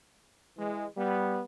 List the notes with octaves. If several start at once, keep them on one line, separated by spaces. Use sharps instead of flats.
E3 G#3
G3 B3